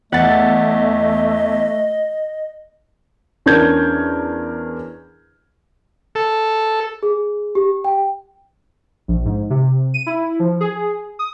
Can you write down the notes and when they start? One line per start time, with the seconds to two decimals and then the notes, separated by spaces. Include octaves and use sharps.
0.12 E2 A3 D#5 F#5 A6
3.46 E2 C#4 D4 A#4 G6 G#6
6.15 A4
7.03 G#4
7.55 G4
7.84 G5
9.08 A#1
9.25 G#2
9.50 C3
9.94 D#7
10.06 E4
10.39 F3
10.61 G#4
11.19 D#6